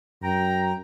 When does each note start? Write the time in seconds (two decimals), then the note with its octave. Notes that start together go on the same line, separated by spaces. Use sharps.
0.22 F#2 G5 A#5